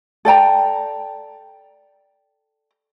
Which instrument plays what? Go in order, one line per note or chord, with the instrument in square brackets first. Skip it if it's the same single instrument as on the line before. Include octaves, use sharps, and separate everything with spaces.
[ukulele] A4 D5 G5 A#5